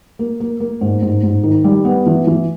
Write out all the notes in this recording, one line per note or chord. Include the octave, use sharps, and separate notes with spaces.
A#3
A#3
A#3
G#2
G#2
G#2
D#3
G3
B3
E3
E3